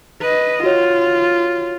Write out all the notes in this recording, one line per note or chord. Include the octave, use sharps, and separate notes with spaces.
B4 D#5
F4 F#4 C#5